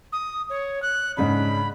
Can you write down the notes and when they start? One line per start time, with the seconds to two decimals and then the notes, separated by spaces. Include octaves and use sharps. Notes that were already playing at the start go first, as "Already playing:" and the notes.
0.13 D#6
0.50 C#5
0.83 F#6
1.17 G#2 C#3 D4 B5